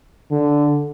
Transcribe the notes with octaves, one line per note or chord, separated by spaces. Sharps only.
D3